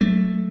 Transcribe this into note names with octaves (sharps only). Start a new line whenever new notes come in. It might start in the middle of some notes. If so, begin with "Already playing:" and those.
F#3 A3